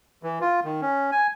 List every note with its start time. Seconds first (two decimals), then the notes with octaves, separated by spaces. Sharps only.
0.23 E3
0.41 F4
0.65 D#3
0.82 C#4
1.12 G#5